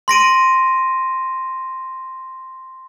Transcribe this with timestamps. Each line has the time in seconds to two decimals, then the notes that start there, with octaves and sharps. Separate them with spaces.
0.08 C6 A#6 D7 D#7